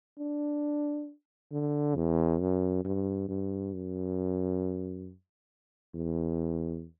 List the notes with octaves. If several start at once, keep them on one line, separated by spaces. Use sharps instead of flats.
D4
D3
E2
F#2
G2
G2
F#2
E2